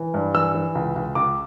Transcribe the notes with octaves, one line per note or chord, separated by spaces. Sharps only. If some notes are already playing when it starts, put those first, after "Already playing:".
Already playing: E3
G2
E3 E6
E3
C#2
C#2
C#2 D6